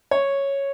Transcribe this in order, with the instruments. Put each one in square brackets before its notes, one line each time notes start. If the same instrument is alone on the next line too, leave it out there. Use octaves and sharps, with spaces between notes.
[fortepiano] C#5